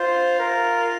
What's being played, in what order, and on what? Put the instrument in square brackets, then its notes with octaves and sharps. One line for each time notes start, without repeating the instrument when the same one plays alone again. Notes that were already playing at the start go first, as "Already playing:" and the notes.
Already playing: [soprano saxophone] F4 [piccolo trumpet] C5
[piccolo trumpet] A#4